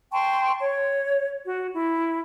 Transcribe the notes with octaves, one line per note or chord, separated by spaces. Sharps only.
G5 A5 C6 C#6
C#5
F#4
E4